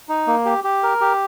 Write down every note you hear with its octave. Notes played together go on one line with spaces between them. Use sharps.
D#4
A#3
G4
G4
A#4
G4